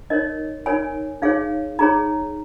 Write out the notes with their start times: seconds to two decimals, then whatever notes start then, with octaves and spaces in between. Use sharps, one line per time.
0.10 D#4 A#4 C#5 D#5
0.66 D#4 A#4 C#5 G#5
1.22 D#4 G#4 C#5 F5
1.79 D#4 G#4 C#5 A#5